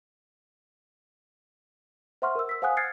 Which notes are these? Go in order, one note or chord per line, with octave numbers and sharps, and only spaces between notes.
C5 E5 F#5 C6 C#6 F6
A#4 E6
E6 B6
C5 F5 F#5 G#5 D#6 F#6
F6 F#6 G#6 A6 C7 C#7